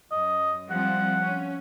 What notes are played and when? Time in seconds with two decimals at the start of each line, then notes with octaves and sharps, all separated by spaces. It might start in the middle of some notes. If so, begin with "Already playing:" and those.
0.11 F#2 D#5
0.70 F3 G3 C4 F#5
1.21 C#4